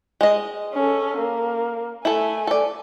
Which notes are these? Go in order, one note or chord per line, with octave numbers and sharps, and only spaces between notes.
G#3 D#5
C#4 A4
A#3
A3 E4 A4 G#5
A4 D5